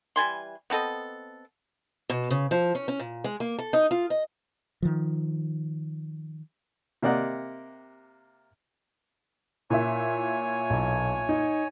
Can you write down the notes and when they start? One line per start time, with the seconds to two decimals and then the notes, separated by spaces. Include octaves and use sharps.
0.16 E3 G3 G#5 C6
0.70 B3 C4 A4 D#5
2.10 B2
2.31 C#3
2.51 F3
2.75 C#4
2.88 C#4
2.99 A#2
3.24 G#3
3.40 A#3
3.58 A4
3.73 D#4
3.91 F4
4.10 D#5
4.82 D#3 F3
7.03 C3 A#3 G4 D5 D#5 F#5
9.70 A#2 E4 C#5 E5 G#5
10.70 B1
11.29 D#4